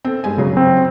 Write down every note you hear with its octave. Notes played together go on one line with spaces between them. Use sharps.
C4 A4
G2 G#3 G#5
F#1 C#3 F#3
C4